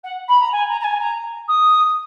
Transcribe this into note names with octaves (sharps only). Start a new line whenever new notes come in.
F#5
B5
A#5
G#5
A#5
A#5
G#5
A#5
D#6